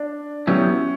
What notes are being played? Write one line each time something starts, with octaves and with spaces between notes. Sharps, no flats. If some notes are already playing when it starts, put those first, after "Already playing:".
Already playing: D4
F#3 B3 C#4 E4 G4